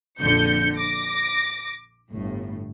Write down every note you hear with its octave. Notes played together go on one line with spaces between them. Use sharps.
A#1 F2 D3 G6 C#7
D6 A#6
G1 A2